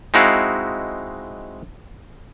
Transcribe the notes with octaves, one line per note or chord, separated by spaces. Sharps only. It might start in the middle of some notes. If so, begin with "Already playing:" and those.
G#3 C4 D#4 E4 F#4 F5